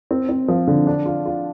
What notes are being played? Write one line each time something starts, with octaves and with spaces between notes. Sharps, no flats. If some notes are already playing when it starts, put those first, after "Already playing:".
C4
C4
F3
D3
D4
F4
F4